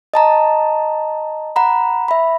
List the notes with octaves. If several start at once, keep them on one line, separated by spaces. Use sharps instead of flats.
D#5 A5 A#5
F#5 A#5 B5
E5 B5